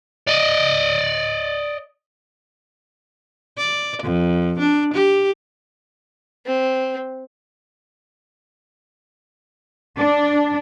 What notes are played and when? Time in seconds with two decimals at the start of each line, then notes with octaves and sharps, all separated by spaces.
0.28 D5 D#5
3.58 D5
4.03 F2
4.59 D4
4.93 G4
6.46 C4
9.98 D4